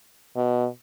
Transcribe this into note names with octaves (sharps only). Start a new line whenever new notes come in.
B2